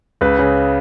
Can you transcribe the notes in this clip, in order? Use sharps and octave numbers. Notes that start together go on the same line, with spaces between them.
C#2 B4
C#3